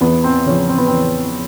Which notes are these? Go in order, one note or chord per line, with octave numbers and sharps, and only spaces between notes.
E2 B3
C4
C#3 F3 C#4
C4
B3
E2 C4